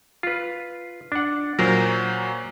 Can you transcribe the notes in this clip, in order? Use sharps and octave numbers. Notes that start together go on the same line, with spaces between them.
F4 B4
D4 F#5
A#2 F#3 A#4 C5